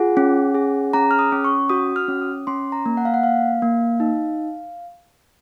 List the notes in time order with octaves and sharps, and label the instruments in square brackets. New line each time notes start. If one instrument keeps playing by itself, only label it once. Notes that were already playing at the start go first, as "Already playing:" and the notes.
Already playing: [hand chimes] F4 G#4 F#5
C#4
G#4
C#4 A#5
F6
D#6
C#4
C#6
F#4 D#6
F6
C#4
D#6
C#4 C6
A#5
A#3
F#5
F5
F#5
A#3 F5
A#3
D#4